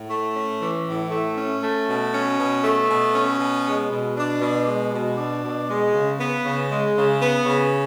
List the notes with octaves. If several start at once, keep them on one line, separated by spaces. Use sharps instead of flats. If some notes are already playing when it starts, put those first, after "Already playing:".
Already playing: A2
A3
C#4
E3
A2
A3
C#4
A3
B2
C#4
B2
A3
B2
C#4
B2
G#3
B2
D4
B2
G#3
B2
D4
B2
G#3
C#3
B3
C#3
G#3
C#3
B3
C#3